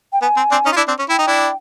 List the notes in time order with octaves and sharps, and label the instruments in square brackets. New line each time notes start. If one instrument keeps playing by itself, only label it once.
[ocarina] G5
[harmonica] B3 [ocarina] G#5
[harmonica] C4
C4 D4
C#4 D#4
F4
D4 E4
C4 D4
C#4
[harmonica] E4 [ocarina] G5
[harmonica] D#4
D4 E4